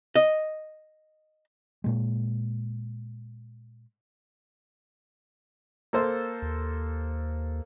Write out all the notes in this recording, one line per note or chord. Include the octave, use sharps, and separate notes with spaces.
D#5
A#2 G#3
A#3 A4 C5
D#2